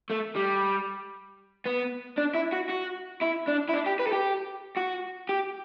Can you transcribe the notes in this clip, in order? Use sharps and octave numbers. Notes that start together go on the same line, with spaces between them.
A3
G3
B3
D4
E4
F#4
F#4
E4
D4
E4
D4
G4
B4
A4
G4
F#4
G4